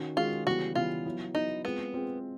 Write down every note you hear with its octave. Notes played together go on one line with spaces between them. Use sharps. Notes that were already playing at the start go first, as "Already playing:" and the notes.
Already playing: D#3 C#4 F#4
D#3 G#3 C#4 F4 F#4
C#3 E3 G3 B3 F#4
C#3 E3 G3 B3 F4
F#3 B3 E4
F#3 B3 D#4 E4
G#3 B3 C4 F4
G#3 C4 F4